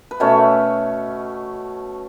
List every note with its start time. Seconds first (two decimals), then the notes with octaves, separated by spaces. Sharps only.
0.11 B4
0.20 B2 A3 C#4 C#5